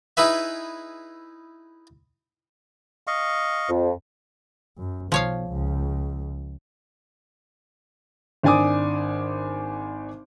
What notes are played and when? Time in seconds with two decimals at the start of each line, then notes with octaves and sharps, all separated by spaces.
0.17 D#4 E4 G#4 B4 E5
3.07 D#5 F5 C#6
3.69 F2
4.78 F#2
5.12 B1 F3 C#5 F5
5.48 C#2
8.43 G#1 D4 D5 G#5 D6 D#6